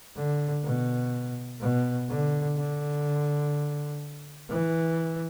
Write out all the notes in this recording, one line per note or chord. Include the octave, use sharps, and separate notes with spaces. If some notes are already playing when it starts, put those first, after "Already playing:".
D3
B2
B2
D3
D3
E3